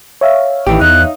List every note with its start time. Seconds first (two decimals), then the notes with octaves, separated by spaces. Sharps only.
0.21 C#5 E5 F5
0.67 A1 D#3 E3 G4
0.81 E2 D#4 F#6